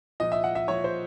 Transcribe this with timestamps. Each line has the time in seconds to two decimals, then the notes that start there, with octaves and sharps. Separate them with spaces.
0.20 A#2 F3 D#5
0.32 E5
0.44 F#5
0.55 E5
0.68 A#2 F3 C#5
0.84 C5